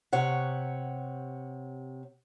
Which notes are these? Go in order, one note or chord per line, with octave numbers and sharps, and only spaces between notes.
C3 C#5 F#5